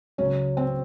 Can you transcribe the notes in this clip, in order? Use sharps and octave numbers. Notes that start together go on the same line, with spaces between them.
C#2 C#3 F#3 C#4
C4